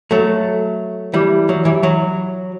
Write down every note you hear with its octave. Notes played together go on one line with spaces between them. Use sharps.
F#3 A3
E3 G3
F#3
E3 G3
F#3